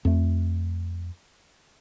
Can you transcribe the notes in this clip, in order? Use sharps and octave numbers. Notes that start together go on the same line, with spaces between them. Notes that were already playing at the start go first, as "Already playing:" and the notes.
F2 A3